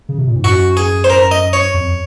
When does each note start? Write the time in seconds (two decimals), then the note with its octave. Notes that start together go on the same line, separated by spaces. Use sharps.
0.09 C#3
0.18 C3
0.27 A#2
0.36 G#2
0.44 F#2 F#4
0.77 G#4
1.04 C5
1.10 A#4
1.31 D#5
1.53 C#5
1.74 F2